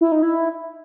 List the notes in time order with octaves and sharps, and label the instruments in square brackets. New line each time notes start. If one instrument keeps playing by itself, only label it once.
[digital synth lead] E4
D#4
E4